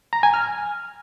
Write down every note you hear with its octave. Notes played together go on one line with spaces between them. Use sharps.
A#5
G#5
F6